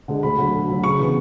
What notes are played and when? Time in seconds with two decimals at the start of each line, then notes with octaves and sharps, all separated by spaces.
0.08 D3 G#3 D4
0.23 D2 B5
0.38 D3 F#3
0.53 D2
0.69 D3 F#3
0.84 C#3 C#6
1.00 E3 B3